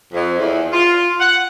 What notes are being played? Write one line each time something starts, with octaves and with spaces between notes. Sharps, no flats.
F2
E2
F4
F#5